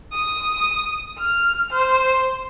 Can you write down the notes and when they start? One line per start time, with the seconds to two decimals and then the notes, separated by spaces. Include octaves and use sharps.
0.13 D#6
1.18 F6
1.72 C5